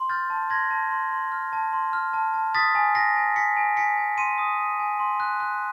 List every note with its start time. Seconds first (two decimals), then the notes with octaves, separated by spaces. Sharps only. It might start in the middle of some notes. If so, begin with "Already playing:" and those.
Already playing: C6
0.09 F6 G6 A6
0.30 A5
0.50 C6 G#6 A#6
0.71 A5
0.91 C6
1.12 C6
1.32 F6
1.53 A5
1.73 C6
1.93 F6
2.13 A5
2.34 A5
2.55 D#6 A6 B6
2.75 G#5
2.95 G#5 A#6 C7
3.16 G#5
3.36 G#5 B6 C#7
3.56 G#5
3.77 G#5 B6 C#7
3.97 G#5
4.18 C6 C#7 D#7
4.38 D#6
4.59 D#6
4.79 G#5
4.99 C6
5.20 F#6
5.40 F#6